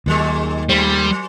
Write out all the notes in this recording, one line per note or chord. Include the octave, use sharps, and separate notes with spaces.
D#2 A#2 D#3 F#3 G#3
A#2 G3 G#3 C5
F#3